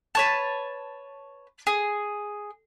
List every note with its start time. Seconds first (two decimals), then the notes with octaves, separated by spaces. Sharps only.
0.15 B4 C#5 A5
1.67 G#4